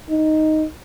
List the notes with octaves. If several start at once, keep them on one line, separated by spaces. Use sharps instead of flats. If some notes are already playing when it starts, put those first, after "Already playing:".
D#4